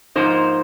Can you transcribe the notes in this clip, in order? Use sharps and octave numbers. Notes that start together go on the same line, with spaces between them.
G#2 F3 A#3 D#4 C5